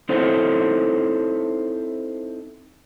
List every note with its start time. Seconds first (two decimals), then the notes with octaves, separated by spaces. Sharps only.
0.09 C4 D#4 E4 A4 C5 C#5